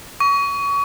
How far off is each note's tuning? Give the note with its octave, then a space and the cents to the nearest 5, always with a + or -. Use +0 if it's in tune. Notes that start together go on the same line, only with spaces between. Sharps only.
C#6 +30